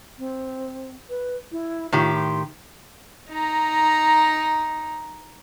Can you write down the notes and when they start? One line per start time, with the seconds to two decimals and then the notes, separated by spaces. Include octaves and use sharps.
0.19 C4
1.09 B4
1.52 E4
1.92 A2 D#3 F4 G4
2.14 C6
3.30 D#4 A#5